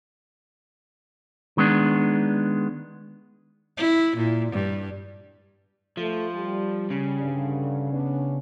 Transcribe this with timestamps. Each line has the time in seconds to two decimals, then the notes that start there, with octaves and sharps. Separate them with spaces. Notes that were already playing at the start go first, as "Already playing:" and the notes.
1.57 D#3 G#3 B3 D4
3.78 E4
4.17 A#2
4.52 G2
5.97 F3 A3
6.35 G3
6.90 C#3
7.22 G2 D3
7.93 B3 C#4 D4